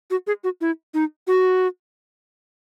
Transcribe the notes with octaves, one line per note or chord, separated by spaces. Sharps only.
F#4
G#4
F#4
E4
D#4
F#4